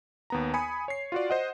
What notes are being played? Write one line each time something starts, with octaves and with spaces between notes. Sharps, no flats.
D#2 B3 A#5
G#5 B5 D#6 C#7
C#5 C7
F4 F#4 D5
C5 D#5 F#5